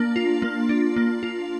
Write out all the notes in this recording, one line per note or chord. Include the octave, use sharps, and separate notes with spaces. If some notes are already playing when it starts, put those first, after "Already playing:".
Already playing: A#3 D4
F4
A#3
D4
A#3
F4